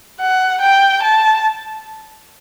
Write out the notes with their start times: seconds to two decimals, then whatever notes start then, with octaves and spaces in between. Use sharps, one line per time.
0.20 F#5
0.61 G5
1.03 A5